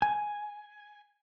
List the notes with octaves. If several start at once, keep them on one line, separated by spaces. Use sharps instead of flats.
G#5